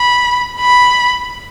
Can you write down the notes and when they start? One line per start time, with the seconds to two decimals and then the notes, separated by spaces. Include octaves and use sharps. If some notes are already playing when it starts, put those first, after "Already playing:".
Already playing: B5
0.60 B5